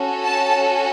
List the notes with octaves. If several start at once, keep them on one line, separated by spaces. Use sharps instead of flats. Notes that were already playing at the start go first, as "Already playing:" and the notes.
Already playing: C#4 F#4 A4
A5